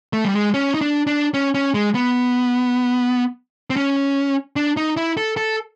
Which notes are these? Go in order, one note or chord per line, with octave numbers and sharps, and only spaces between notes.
A3
G3
G#3
C#4
D#4
D4
D4
C#4
C#4
G#3
B3
C4
C#4
D4
D#4
E4
A4
A4